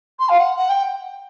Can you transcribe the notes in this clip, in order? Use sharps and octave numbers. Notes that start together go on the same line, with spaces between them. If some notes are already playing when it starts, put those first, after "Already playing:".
C6
F5
F#5
F#5
G5